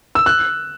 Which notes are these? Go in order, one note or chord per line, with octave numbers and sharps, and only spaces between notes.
E6
F#6